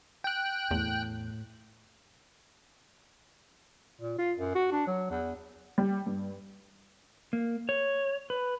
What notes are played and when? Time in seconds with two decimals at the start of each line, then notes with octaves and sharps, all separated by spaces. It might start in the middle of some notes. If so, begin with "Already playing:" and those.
0.24 G5 F#6
0.71 E2 A2
4.01 A#2
4.18 F4
4.38 F#2
4.55 F#4
4.71 D4
4.87 F#3
5.10 E2
5.78 G3
6.06 G2
7.33 A#3
7.69 C#5
8.30 B4